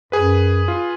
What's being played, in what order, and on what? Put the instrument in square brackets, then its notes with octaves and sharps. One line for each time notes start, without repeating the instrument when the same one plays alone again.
[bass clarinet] F#2 [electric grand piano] G#4 B4
[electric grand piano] F4